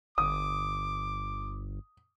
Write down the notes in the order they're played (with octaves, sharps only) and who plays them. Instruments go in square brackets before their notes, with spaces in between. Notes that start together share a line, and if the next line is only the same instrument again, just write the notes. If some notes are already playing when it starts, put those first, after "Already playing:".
[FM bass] G1 [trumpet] D6 [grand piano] D#6